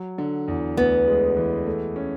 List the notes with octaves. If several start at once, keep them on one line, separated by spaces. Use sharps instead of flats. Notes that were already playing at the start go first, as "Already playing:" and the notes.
Already playing: F#3
D3
E2
D2 B3
G#3
E3
A3
C#4